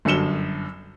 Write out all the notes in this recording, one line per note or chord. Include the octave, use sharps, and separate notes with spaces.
G1 F#2 D3 C#7 E7 G7